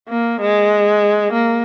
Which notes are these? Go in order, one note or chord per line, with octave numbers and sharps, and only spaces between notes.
A#3
G#3
A#3